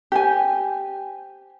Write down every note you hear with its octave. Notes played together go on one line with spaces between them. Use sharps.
G4 C5 G#5